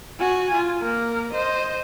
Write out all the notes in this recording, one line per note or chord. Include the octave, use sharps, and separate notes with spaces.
F#4 G#5
F4
A#3 A#4
C5 D#5